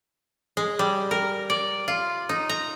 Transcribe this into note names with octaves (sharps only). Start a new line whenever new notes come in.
G#3
G3
A#4
D5
F4
D#4
A#5